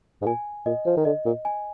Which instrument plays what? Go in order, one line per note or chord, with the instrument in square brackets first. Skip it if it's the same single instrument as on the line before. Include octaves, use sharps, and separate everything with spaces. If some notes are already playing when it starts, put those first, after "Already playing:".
[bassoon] G#2
[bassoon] A#2 [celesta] G#5
[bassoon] A#2 [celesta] D#5
[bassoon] F3
D#3
[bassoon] D3 [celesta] D#5
[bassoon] A#2
[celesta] G#5